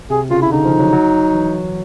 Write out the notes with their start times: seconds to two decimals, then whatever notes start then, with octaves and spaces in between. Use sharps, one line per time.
0.10 C3 G#4
0.31 C#3 F4
0.42 E4
0.51 D3 D#4
0.65 F3
0.79 F#3
0.93 F#3
1.35 E3